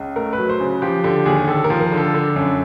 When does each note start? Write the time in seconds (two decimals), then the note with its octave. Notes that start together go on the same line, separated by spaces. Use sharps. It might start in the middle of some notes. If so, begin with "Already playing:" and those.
Already playing: C#2
0.16 A3 A#4
0.33 B4
0.38 F#3
0.49 C5
0.60 C#3
0.82 F3 G4
1.04 D3 G4
1.26 D#2 G#4
1.48 D#2 A4
1.64 A#4
1.70 F3
1.80 A#4
1.92 D3
1.97 A4
2.14 D3
2.36 F#2